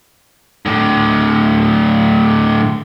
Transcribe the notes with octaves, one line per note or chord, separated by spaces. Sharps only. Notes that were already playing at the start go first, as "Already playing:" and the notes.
A2 D3